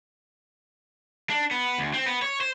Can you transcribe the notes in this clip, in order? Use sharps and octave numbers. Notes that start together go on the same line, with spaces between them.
D4
B3
D2
C4
B3
C#5
C5